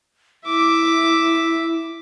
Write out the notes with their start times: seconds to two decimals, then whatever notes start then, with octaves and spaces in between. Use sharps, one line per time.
0.45 E4 E5 D6